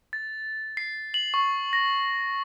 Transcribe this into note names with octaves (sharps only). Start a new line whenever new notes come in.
A6
C7
F#7
C#6
A#6